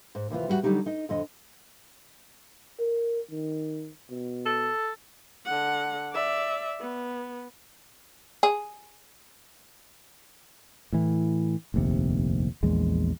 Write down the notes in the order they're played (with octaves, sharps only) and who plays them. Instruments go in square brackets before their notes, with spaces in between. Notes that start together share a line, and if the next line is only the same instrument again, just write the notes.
[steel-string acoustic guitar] G#2
D#2 C3 E3 F4
E2 G3 A3 F#4 F#5
D3 F#3 G3 A3 D#4 G4
D#4 D#5
F2 D3 D#5
[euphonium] A#4
D#3
B2
[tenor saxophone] A4
[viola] D3 F#5
D5 E5
B3
[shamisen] G#4
[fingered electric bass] A2 E3
F1 A#1 D#2 C3
A#1 E2 G#3